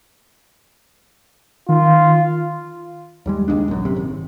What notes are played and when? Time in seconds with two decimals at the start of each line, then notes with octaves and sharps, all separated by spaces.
1.69 D#3 F4
3.26 D#2 G3 G#3
3.48 F#1 D#2 G#3 D4
3.68 A#1 F#2
3.85 C3
3.96 G#1